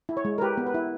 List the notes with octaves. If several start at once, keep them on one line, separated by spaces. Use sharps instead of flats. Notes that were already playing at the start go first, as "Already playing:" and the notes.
E4
C#5
G#3
A#4
G4 B4
B3
B4
E4